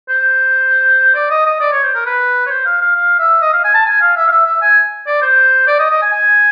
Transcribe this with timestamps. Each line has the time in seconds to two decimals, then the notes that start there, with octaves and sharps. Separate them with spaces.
0.09 C5
1.15 D5
1.30 D#5
1.46 D#5
1.60 D5
1.72 C#5
1.83 C5
1.95 A#4
2.06 B4
2.46 C#5
2.50 C5
2.66 F5
2.81 F5
2.95 F5
3.19 E5
3.42 D#5
3.53 F5
3.64 G#5
3.74 A5
3.86 G#5
4.01 F5
4.17 E5
4.27 F5
4.31 E5
4.46 E5
4.62 G#5
5.07 D5
5.22 C5
5.67 D5
5.79 D#5
5.90 D#5
6.02 G#5
6.12 G#5